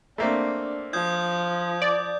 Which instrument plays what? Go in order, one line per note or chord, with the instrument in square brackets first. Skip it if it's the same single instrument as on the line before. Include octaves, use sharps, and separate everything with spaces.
[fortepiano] A3 A#3 C4 [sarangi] D4
[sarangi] F3 [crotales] D#6 G6 G#6
[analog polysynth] D5